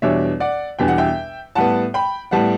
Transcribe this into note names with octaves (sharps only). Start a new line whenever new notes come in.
E2 B2 G3 D4 C#5 E5
D5 F#5
E2 B2 G3 D4 G5
F#5
E5 G5
A2 G3 B3 F#5 A5
G5 B5
A2 G3 B3 F#5 A5